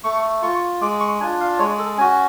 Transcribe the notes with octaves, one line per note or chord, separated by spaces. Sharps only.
A3 C#6
F4 C#6
G#3 D6
C#6
D4 F4 G#5
F5
G#3 C#5
A4
C#4 F#4 G#5